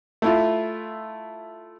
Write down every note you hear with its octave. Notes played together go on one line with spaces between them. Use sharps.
A3 E4 F4